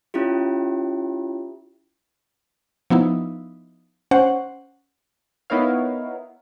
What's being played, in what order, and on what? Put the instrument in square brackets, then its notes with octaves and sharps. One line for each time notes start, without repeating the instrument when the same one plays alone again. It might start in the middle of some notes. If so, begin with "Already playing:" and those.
[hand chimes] C#4 E4 F4 G4
[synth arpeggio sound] F3 B3 D#4 E4
C#4 C5 F#5
[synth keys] B3 D#4 E4 A#4 C#5 F5